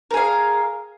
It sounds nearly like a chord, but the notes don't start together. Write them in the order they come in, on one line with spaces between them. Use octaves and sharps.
A#4 G#4 F5